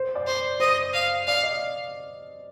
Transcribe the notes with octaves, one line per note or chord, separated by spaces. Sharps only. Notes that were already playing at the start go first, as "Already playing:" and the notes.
Already playing: C5
D5
C5
C5 D#5
F5
D5 F5
D#5